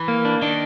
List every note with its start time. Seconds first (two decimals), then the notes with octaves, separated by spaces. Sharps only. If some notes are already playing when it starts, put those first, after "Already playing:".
Already playing: E3
0.08 A#3
0.25 D4
0.42 D#3 D4